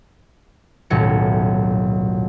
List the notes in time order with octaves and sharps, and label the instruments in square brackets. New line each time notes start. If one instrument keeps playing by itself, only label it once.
[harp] D#1 B1 A2 F#3 C#7